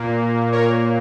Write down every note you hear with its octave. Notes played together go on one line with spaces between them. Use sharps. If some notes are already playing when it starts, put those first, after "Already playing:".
Already playing: A#2 A#3
A#4 C#5